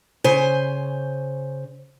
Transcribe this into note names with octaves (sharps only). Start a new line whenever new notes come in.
C#3 C5 G#5